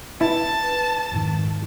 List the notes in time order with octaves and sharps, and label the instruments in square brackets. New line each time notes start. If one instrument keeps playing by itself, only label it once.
[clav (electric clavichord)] E4 [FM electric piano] B4 [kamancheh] A5
[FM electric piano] F2 G#2 D#3